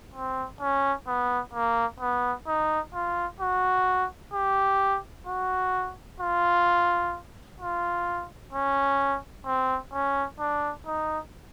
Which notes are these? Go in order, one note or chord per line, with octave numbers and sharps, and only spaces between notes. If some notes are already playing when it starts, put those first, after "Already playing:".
C4
C#4
B3
A#3
B3
D#4
F4
F#4
G4
F#4
F4
F4
C#4
C4
C#4
D4
D#4